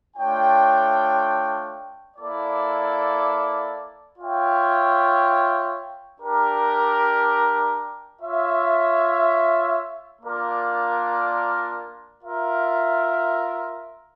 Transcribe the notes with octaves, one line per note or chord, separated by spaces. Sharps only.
A3 D4 F4 C#5 G5
A#3 E4 A4 D5
F4 C#5 E5 G5
D4 G4 A#4
F4 C#5 E5
A#3 D4 F4 A#4 D5
F4 A#4 E5